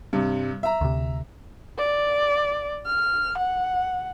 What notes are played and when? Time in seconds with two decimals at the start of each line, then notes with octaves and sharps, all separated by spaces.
0.13 G2 C3
0.63 E5 A#5
0.81 D2 C3
1.78 D5
2.86 F6
3.38 F#5